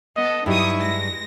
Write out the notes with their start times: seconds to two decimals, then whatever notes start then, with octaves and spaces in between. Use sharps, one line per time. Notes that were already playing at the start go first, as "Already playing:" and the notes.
0.16 B3 A4 D#5
0.46 G2 F#3 D#4 E4 G4 C#6 D#6
0.81 G#3 A#6